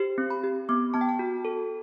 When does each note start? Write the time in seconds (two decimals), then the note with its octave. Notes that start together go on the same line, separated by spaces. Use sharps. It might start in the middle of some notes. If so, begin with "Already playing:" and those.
Already playing: G4 C5
0.18 C4
0.30 B5
0.44 G4
0.69 B3 D6
0.94 B3 A5
1.01 G5
1.09 A5
1.19 F#4
1.45 A4